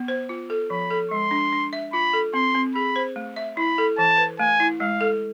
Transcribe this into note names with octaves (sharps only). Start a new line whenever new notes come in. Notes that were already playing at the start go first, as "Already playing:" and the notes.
Already playing: B3
C5
F4
A4
F3 B5
A4
G#3 C6
D4
D4
E5
F4 B5
A4
C4 C6
C4
G#4 B5
C5
A3
E5
E4 B5
A4
E3 A5
B4
A3 G#5
E4
G#3 F5
A4